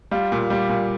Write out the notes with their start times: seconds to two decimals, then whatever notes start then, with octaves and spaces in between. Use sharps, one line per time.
0.11 G3 F4
0.32 A#2
0.50 G3
0.69 A#2